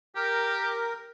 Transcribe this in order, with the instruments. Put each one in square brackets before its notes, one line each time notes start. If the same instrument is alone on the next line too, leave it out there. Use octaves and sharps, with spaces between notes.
[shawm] G4 [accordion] A#4